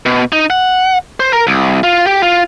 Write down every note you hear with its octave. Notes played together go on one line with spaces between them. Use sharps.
B2
D#4
F#5
C5
A#4
C2
F4
G4
F4